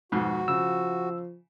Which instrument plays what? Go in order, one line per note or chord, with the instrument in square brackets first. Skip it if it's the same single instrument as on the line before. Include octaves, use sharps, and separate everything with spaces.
[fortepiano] F2 G#2 B2 [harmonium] F#4
[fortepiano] C#3 [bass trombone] F3 [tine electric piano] E6